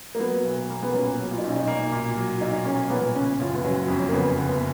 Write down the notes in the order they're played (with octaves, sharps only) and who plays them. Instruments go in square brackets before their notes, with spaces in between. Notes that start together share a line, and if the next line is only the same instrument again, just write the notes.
[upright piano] A#3
[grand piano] F#3 [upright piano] B3
[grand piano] B1
A#3
[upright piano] B3
[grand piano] A#2 [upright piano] C#4
[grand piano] F#3
[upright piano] F4
D#4
[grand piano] B1 [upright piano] C#4
[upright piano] D#4
[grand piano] A#3
A#2
F#3
[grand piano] B1 [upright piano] D#4
[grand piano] A#3 [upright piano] C#4
[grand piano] A#2 [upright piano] B3
[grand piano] C#3 [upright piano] C#4
[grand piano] F#1 [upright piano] F4
[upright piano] B3
[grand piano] F#3 [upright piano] C#4
[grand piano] F2 [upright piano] C#4
[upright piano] A#3
[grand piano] C#3 [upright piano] B3
[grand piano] F#1 [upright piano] B3